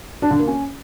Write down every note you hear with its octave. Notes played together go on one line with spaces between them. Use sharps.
D4
D3
A#3
C#4